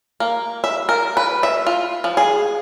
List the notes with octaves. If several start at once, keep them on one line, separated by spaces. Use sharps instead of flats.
A#3
E5
A#4
B4
E5
F4
F3
G#4